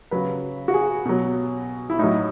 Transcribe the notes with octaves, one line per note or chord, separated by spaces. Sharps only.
C#3 F#3 B4
F#4
G#4
B2 F#3
E4
A2 F#3 D#4